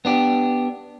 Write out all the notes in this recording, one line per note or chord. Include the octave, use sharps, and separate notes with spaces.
B3 D4 G4